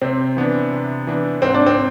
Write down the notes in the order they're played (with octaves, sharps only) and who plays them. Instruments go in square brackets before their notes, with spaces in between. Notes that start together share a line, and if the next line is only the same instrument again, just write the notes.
[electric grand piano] C3 [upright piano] C4
[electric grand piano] E3 B3 D4
C3
E3 B3 D4
[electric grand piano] G#2 [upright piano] C4
[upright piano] D4
C4